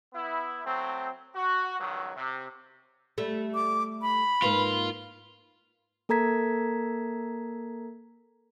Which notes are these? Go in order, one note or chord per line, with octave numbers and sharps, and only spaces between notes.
B3 E4
F#3 A3 C4
F#4
C#2 G2 D#3 F#3
C3
G3 A3
D6
B5
G#2 A#3 F4 B4
A#3 A4 A#4 A#5 G#6 B6